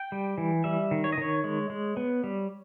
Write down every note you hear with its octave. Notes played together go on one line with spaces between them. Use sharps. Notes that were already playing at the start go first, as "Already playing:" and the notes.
Already playing: G5
G3
E3
G3 E5
D#3
C#5
D#5
D#3 C#5
G#3
G#3
B3
G3